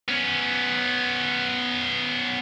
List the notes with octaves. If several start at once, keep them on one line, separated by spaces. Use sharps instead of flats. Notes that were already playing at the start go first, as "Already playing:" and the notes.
B3 C#4